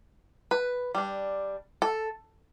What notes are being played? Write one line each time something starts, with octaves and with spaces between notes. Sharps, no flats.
B4
G3 D4
A4